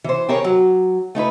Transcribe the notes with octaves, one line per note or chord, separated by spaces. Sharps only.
E3 C5
G4 G#4 A#4 B4 C#5
F#3
A3 D#4 E4 B4